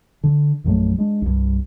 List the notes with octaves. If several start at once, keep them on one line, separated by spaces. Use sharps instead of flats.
D3
A#1 F#2 F#3 A3
G#3 D4
C2 G2